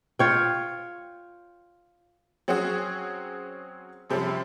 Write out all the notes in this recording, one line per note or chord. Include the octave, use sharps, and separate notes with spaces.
F4 C#5 G5
F#3 C4 C#4 F#4 G#4
F#2 C3 F3 G3 C#4